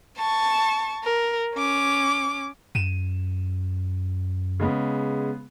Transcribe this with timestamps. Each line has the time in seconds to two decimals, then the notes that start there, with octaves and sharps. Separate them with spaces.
0.17 A5 C#6
1.04 A#4
1.55 C#4 D6
2.75 F#2 D#7 E7
4.60 C#3 G#3 B3